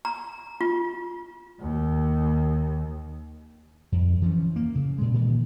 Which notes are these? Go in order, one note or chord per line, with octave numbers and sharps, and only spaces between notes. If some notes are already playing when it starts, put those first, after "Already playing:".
A#5
F4
D#2
F2
E3 F3 G#3 C#4
A#3
C#3
A#2 G#3
A#2 D#3 E3